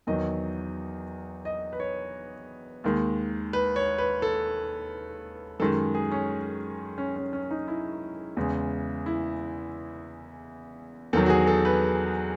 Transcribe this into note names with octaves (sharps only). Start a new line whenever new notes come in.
E2 D#3 F#3 D#5
D#5
B4
C#5
D#2 D#3 G#3
B4
C#5
B4
A4
F#2 D#3 G#3 A4
G#4
C#4
C#4
C#4
C#4
D#4
E4
E2 C#3 G#3
E4
E2 D#3 F#3 A4
F#4
G#4
A4
B4